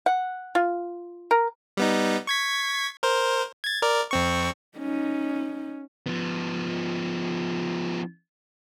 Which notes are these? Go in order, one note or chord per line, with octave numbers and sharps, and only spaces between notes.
F#5
F4
A#4
G3 B3 D#4
C#6 G#6 B6
A#4 C5
G#6 A6
A#4 D5
F2 C4 C#6
C#4 D#4
F3 B3